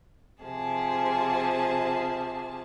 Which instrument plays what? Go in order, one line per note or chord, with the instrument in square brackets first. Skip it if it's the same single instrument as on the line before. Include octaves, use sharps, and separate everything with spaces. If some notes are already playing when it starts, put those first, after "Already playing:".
[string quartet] C3 F3 G#4 A5